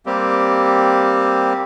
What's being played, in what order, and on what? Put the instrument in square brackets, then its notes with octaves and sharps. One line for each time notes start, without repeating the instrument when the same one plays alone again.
[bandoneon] G3 A#3 C4 G4